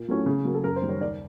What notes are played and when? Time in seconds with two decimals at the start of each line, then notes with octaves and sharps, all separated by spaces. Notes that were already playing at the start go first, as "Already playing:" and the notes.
Already playing: A#2
0.08 F#3 A3 C#4 E4
0.26 C#3
0.45 F#3 A#3
0.54 A4
0.64 F#2 A#4
0.76 C5
0.82 D#3 G3
0.89 C#5
1.01 D#2 D5